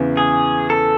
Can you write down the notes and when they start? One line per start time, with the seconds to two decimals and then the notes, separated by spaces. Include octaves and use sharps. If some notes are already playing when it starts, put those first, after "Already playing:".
Already playing: E2 C#3 E3
0.17 G#4
0.70 A4